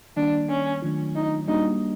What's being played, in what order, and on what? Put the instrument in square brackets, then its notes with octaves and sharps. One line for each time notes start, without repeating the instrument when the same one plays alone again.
[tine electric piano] D#3 G3 A#3 [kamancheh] D4
[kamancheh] C#4
[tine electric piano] D#3 F#3 A3 D4 F4
[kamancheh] D#4
[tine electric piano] G3 A#3 D4 F#4 [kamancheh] D#4